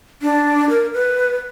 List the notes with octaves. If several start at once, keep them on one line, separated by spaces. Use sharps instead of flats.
D4
A#4
B4